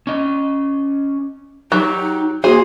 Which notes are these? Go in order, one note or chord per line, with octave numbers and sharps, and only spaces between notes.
C#4 D#5
F#3 D#4 G4
A#3 F#4 G#4 C5